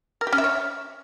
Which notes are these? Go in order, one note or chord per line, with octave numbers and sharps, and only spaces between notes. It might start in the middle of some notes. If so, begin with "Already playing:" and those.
A#4
G4
C#4
E5
C#5